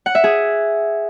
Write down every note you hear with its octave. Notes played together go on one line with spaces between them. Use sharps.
F#5
E5
G#4